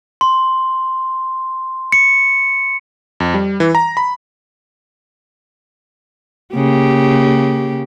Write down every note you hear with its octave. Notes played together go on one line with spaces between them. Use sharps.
C6
C#7
F2
G3
E3
A#5
B5
C#3 A#3 G4